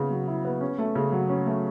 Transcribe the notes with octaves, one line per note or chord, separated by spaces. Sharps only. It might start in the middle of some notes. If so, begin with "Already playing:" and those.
Already playing: C#3 B3 E4
F#3
E4
B3
C#4
A3
C#3
F#3
C#4
A3